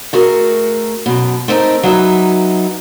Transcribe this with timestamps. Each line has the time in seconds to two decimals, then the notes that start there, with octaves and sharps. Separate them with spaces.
0.13 A3 F#4 G#4 A#4
1.06 F#2 B2
1.48 A3 C4 D#4 A4 A#4
1.83 F#3 D#4 B4 E5